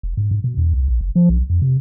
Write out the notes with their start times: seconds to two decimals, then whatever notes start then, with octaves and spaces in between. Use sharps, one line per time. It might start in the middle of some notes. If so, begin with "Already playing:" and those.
0.03 E1
0.17 G#2
0.31 G#2
0.44 B2
0.57 E2
0.73 C2
0.88 A#1
1.01 F#1
1.16 F3
1.29 B1
1.50 F2
1.62 C3